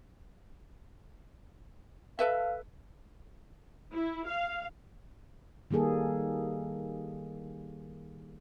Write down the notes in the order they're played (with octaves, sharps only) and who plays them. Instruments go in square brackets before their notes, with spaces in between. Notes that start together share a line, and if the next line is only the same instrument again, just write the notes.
[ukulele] A4 B4 E5 [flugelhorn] F5
[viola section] E4
F5
[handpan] D#3 G3 A#3 G#4 A4